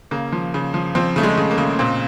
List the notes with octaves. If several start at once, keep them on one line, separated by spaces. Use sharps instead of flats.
C#3 A#3
F3
C#3
F3
F3 C4
C#3 A3
G#3
C#3
A#3
C#3
A#2 C4